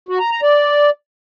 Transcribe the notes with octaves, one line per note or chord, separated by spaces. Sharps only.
F#4
A#5
A#5
D5